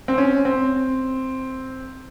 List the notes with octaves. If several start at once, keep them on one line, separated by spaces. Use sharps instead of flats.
C4
C#4
C4